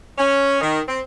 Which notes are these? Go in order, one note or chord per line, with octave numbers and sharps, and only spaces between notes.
C#4
D#3
C4